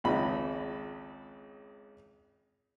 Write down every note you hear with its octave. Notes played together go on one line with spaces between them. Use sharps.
G#1 C#2 B5